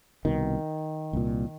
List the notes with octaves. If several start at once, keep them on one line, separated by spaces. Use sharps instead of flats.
C2 B2 D#3
C2 A#2